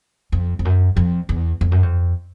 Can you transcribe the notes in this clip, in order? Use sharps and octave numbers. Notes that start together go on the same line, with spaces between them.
F2
F2
F#2
F2
E2
F2
F#2
F2